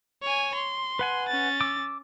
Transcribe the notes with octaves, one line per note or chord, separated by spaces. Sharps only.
C#5 G#5
C6
B4 F#5 G#5
C#4 A6
D6 E6